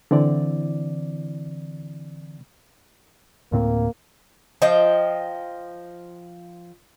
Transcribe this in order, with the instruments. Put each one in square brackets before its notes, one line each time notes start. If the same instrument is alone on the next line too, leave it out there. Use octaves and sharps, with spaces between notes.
[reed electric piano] D3 E3 C4 E4 D5
[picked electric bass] D2 A2 C4 [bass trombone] A#3
[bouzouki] F3 D#5 G5